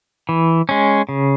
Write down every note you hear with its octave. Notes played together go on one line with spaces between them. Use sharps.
E3
G#3 C#4
C#3